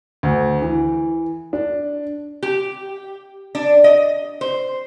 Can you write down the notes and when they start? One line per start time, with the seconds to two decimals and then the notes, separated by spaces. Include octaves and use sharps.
0.23 D2
0.62 E3
1.53 D4
2.43 G4
3.55 D4
3.84 D#5
4.41 C5